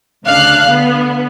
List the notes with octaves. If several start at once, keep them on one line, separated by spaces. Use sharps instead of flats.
D2 C#3 D4 F5 F#6
D3 B3